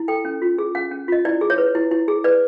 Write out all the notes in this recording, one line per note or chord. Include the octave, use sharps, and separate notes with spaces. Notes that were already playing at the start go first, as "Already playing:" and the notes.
Already playing: E4
A4 G5
C#4
F4
G#4
C#4 F#5
C#4
F4 D#5
E4 D5
G#4
C#5
B4
E4
E4
G#4
B4 D5